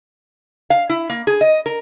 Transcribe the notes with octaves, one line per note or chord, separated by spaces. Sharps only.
F5
E4
A#3
G#4
D#5
A#4